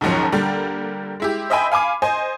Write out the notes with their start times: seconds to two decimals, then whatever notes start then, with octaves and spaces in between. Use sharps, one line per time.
0.01 D#2 G#2 D#3 F3 F#3 C#4
0.32 D3 G3 A#3
1.20 G#3 E4 G4
1.50 C5 D#5 E5 G5 G#5 B5
1.72 F5 G#5 B5 D6
2.02 C5 D#5 G#5